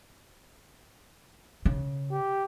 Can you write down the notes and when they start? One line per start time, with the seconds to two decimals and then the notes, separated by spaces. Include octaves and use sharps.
1.65 C#3
2.11 G4